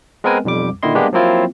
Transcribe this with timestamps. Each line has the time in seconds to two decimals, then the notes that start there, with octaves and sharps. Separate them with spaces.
0.24 G#3 B3 C4 A#4 B4 G#5
0.44 B1 F2 G3 D6
0.83 A#2 D3 D#3 E4 D#5 C6
0.95 G3 G#3 A#3 B3 D4 G4
1.13 F3 F#3 A#3 C4 E4 F4